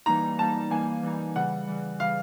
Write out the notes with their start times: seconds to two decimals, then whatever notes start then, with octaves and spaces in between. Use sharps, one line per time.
0.06 E3 G3 A#3 D#4 A#5
0.38 E3 G3 A#3 D#4 A5
0.70 E3 G3 A#3 D#4 G#5
1.03 E3 G3 A#3 D#4
1.36 C#3 E3 G3 F#5
1.67 C#3 E3 G3
1.99 C#3 E3 G3 F5